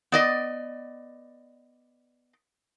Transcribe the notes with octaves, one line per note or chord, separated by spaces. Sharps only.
B3 D5 D#5